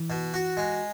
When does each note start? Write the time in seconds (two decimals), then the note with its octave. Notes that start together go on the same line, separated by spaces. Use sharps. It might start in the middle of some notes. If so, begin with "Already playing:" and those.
Already playing: E3
0.10 B2
0.34 F#4
0.57 G#3